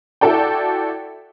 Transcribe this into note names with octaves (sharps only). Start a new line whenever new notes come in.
E4 F#4 A4 D5 G5